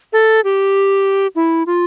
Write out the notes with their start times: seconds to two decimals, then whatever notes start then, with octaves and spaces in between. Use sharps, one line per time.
0.13 A4
0.44 G4
1.35 E4
1.67 F4